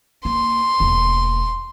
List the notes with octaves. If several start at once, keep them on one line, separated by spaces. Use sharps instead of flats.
A#3 C6
E1 A#3